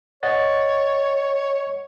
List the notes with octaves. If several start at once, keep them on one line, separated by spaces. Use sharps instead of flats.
C#5 D#5 F#5 A6